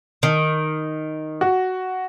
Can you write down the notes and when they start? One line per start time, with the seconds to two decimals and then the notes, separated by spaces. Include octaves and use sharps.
0.23 D#3
1.41 F#4